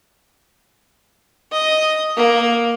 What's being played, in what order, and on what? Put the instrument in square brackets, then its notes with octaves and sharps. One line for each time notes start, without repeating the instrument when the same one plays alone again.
[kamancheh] D#5
A#3